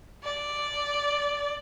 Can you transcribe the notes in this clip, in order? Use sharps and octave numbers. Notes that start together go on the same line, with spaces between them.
D5